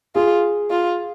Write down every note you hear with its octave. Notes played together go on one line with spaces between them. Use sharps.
F4 G#4
F4